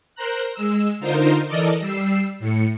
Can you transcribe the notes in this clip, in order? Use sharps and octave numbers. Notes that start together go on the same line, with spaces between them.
A#4 C5 A#5 F#6
G#3 E6
D3 D#4 F4 A#4 C5
E3 A4 A#4 D5 D#5
G3 E6 C7
A2 C#7